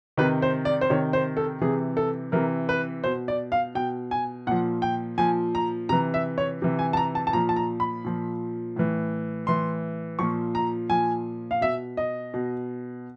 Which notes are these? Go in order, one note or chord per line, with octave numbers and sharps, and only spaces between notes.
C3 D#3 B4
C5
D5
C5
C3 D#3 C#5
C5
A4
C3 E3 G#4
A4
C3 E3 A#4
B4
B2 C5
D5
F5
B2 G5
G#5
A#2 F3 F#5
G5
A#2 F3 G#5
A#5
C3 E3 A#5
E5
C#5
C3 E3
G#5
A5
A#5
A5
A5
A#2 F3 A#5
A5
A#5
B5
A#2 F3
A2 E3
A2 E3 C6
A#2 F3 C#6
A#5
A#2 F3 G#5
F5
B2 E5
D#5
B2